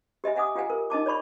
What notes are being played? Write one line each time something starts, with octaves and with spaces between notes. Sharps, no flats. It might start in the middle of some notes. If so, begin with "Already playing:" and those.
G4 D#5 E5 G#5
D#5 E5 F#5 G#5 D6 D#6
F4 G4 F5 F#5 G#5
A#4
D#4 D#5 A5 D6
C#5 D5 B5 C#6